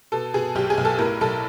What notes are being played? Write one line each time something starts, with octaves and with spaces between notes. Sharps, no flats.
B2 A4
B2 G#4
B1 G4
G#4
B1
A4
A2 A#4
B1 A4